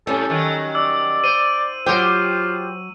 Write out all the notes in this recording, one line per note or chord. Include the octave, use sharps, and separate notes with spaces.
A2 G3 C#4 A4
D#3 F#3
D5 E6
C5 D#7
F#3 F4 G4 C5 G5